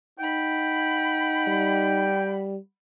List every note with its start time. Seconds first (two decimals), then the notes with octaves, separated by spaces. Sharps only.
0.19 D#4 F#5 G5 B5
1.47 G3